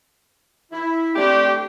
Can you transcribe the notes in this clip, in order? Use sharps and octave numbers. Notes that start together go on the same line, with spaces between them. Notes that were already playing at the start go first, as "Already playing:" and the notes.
E4
A3 C4 D4 G4